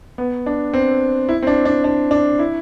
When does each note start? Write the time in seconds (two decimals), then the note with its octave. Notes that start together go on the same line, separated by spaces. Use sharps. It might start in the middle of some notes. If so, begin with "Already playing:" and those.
0.18 B3
0.46 D4
0.74 C4
1.29 E4
1.43 C4
1.47 D4
1.65 D4
1.84 D4
2.11 D4
2.39 E4